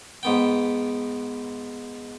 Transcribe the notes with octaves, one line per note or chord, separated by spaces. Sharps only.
G#2 B3 G5